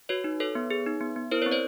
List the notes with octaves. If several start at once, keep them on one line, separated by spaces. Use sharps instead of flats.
F#4 B4 C#5
D#4
A4 B4 C#5
B3
G#4
D#4
B3
B3
E4 A#4 C5
C4 B4 C#5
C5 D5